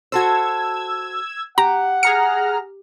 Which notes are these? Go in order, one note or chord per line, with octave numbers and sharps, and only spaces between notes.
F#4 A4 C5 E6 G#6
G4 F#5 A#5
G#4 A#5 F6 C#7